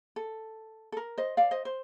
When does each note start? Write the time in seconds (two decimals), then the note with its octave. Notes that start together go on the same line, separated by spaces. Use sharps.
0.16 A4
0.92 A4
0.97 A#4
1.18 C5 D#5
1.37 D5 F5
1.51 C5 D#5
1.65 C5